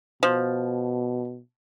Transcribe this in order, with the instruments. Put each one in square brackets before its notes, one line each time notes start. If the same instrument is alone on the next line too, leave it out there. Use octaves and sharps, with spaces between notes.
[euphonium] B2 [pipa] F3